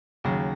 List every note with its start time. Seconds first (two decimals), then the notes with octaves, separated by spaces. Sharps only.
0.24 D#2 C#3 F#3